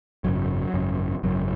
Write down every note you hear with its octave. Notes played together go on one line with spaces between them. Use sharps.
G#1 F#2 C#3 F#3
G#1 F#2 C#3
G#1 F#2 C#3 F#3